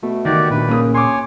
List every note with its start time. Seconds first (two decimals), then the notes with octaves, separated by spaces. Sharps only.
0.03 B2 A3
0.25 D#3 F#4 G4 D5
0.51 D2 A#2 B4
0.69 C#3 A#3 D#6
0.94 C#5 G#5 C6 D6